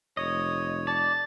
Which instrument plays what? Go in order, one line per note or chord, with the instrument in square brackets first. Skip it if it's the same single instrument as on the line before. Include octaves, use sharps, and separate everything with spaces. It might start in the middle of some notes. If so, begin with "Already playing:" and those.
[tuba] F1 [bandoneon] C#5 [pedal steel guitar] D#5
[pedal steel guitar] D5 [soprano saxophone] A5